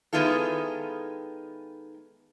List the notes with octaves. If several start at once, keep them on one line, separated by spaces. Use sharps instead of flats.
D#3 G#3 B3 E4 F4 A4